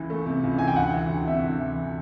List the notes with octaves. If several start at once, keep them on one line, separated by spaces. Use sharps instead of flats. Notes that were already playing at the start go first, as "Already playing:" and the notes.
Already playing: C#2 E3
A3
C3
C#2
E3 G#5
G5
D2 F#5
E3
D2
C3 E5
D2
E3